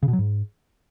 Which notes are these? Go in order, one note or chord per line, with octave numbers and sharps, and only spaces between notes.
C#3
B2
F#3
G#2